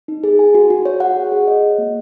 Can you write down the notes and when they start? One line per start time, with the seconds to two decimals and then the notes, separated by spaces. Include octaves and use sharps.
0.08 D#4
0.24 G#4
0.39 G#5
0.55 F#4
0.70 F#4
0.85 C#5
1.00 F#5
1.16 G#4
1.32 G#4
1.48 D#5
1.62 F#4
1.78 A#3